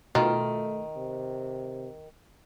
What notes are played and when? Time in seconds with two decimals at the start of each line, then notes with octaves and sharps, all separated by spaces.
0.15 B2 D#3 A3 F4
0.96 C3